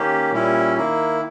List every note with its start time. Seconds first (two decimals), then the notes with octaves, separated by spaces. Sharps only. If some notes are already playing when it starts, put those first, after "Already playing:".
Already playing: D#3 A#3 C#4 G4
0.32 A#2 G3 C#4 E4
0.77 D#3 A#3 E4